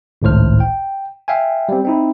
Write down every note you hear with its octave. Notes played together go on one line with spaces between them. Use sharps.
G#1 C#2 A2 C5 F6
G5
E5 F5 G5 G#5
G3 C4
C4 D#4 E4